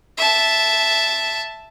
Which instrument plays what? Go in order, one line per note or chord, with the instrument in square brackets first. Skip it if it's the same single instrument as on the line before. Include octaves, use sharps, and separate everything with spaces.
[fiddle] E5 A5